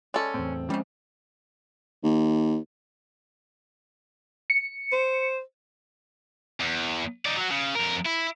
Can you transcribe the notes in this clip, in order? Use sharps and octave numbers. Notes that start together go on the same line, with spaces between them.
G#3 C#4 A4 D5
E2 A2 C4
C#3 F3 G3 G#3 C#4
D#2
C#7
C5
E2
D#4 D5
F#3 F#4
C#3
F2 A#4
E4